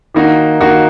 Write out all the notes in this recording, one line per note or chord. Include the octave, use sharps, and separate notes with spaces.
D#3 A#3 D#4 F#4
D#3 A#3 D#4 F#4